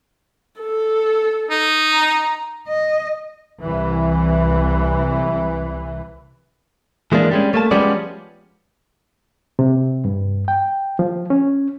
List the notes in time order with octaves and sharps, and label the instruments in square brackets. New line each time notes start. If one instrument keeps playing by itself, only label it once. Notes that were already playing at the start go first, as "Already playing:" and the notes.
[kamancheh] A4
[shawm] D#4
[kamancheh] A#5
[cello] D#5
[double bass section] C2 E3
[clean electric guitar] E3 G#3 A#3 D4
G3 G#3 C#4
A3 A#3 A5
F3 G3 G#3 B3 C#4 D5
[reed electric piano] C3
G2
G5
F3
C#4